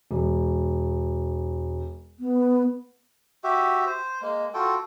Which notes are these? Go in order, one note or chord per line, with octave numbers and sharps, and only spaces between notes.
E1
B3
F#4 G4 E5
C5
G#3 A#3
F4 F#4 A4 G5